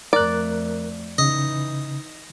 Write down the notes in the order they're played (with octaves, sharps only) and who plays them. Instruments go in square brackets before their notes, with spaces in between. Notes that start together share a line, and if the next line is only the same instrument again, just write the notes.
[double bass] F2 A3 [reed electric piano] A#4 F#6 [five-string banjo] D5
[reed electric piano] C#3 [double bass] E3 D#4 [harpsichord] D#5